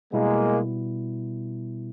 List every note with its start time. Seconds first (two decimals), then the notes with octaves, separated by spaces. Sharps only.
0.13 B2 G3 G#3 A#3 B3 E4